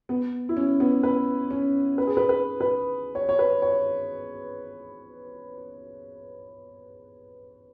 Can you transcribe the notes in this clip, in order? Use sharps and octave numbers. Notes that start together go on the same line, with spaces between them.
B3
E4
C#4
B3
B4
C#4
B4
G#4
B4
B4
B4
C#5
C#5
B4
C#5